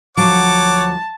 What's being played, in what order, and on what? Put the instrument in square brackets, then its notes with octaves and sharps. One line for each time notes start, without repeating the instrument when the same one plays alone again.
[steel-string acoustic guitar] D2 F3 F#3 [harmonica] C#5 F#5 D6 [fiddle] A5